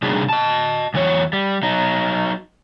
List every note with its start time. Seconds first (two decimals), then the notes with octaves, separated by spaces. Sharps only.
0.02 C3 G3 D4 D#4 F#4 G#4
0.29 D#5 A5
0.94 E2 E3 F#3 C#5
1.33 G3
1.63 F#3 D#4